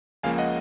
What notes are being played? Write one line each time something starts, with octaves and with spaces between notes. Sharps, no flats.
C#2 C#3 F3 A#3 F5 G#5
D#5 F#5